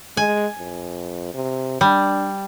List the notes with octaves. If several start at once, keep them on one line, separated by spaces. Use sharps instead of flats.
G#3 G#5
F2
C3
G3 D4